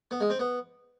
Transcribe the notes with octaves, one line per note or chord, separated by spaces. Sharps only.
B3
G#3
C4
B3